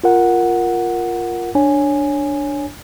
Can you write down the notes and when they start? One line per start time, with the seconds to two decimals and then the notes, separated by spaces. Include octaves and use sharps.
0.04 F4 A#4 F#5
1.55 D4 C#5 G#5